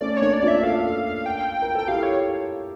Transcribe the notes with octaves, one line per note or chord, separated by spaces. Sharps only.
A3 C#4 D5
C#5
A#3 D4
D5
D4 F4
E5
F4 A4 F5
G5
A#4
A4 G5
E4 G4 F5
C#5